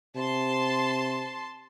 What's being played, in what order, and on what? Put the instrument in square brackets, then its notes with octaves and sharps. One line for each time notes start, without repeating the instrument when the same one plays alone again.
[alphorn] C3 [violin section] A5 C6